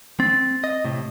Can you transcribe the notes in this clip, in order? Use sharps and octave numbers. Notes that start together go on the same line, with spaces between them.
C4 A6
D#5
A2 C3